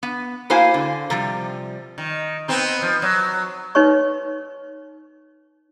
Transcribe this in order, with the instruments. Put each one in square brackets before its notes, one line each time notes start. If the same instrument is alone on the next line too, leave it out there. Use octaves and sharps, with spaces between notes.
[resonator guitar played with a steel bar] B3
A#3 E4 F#4 C5 F5 G#5
D3
C3 F3 G3
[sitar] D#3
B3 C4 D#4
F3
F#3
[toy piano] D#4 B4 C#5 C#6